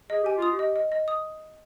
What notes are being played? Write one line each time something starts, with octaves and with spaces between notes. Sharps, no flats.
G#4 D#5
G4 G#5
F4
D#6
G4
D#5
D#5
D#5
D#6